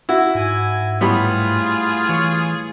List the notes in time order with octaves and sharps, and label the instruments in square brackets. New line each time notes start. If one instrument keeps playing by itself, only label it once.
[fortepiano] E4 F#4
[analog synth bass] G#2 [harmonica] G#5
[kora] A2 G3 [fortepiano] B3 B5 [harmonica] F4 G#4
[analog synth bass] E3 [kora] C#5